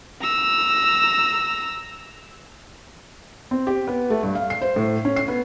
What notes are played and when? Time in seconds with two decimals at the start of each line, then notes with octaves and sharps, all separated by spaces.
0.21 A#5 E6
3.51 C4
3.67 G4
3.87 B3
4.10 A3
4.23 G2
4.35 F5
4.50 C7
4.62 C5
4.76 A2
5.05 C#4
5.16 C7
5.28 B3